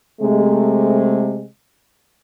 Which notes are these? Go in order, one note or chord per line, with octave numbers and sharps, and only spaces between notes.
C3 G#3 A3